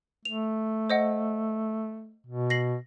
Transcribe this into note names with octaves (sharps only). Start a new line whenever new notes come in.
A3 F7
C5 D#5 F#5
B2
A#6 C7 F#7